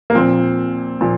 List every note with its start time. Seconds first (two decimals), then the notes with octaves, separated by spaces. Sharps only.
0.10 A#3
0.15 A#2 F3 C4
1.01 A#2 F3